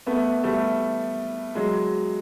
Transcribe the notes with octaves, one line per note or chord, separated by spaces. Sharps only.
A3 B3
G3 A3
F#3 G#3